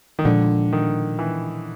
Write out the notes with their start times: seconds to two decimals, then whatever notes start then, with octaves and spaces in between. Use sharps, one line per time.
0.19 D#3
0.25 A#2 D3 F3 G#3
0.73 D#3
1.19 E3